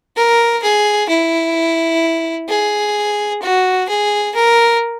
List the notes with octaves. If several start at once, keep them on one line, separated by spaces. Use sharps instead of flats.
A#4
G#4
E4
G#4
F#4
G#4
A#4